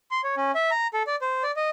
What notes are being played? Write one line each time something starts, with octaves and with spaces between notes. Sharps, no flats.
C6
C#5
C#4
E5
A#5
A4
D5
C5
D5
D#5